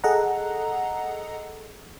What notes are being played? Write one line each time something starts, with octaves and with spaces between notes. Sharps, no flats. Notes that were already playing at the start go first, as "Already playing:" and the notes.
G#4 A4 D#5 F#5 A#5